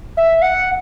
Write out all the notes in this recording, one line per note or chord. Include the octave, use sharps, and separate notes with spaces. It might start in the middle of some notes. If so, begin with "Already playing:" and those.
E5
F#5